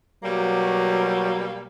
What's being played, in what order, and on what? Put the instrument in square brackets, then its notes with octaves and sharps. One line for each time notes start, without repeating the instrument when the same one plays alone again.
[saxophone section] B2 G3 A#3 [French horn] F#3